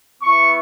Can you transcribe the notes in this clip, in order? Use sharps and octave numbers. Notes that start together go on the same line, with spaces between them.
B3 E4 C#6